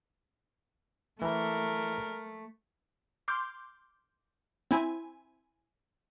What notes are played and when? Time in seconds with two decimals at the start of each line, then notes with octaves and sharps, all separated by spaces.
1.22 E3 A3 A#4
3.28 C6 D6 F6 G6
4.71 C4 E4 G#5